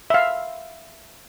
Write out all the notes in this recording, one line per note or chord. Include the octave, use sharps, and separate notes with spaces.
E5 F5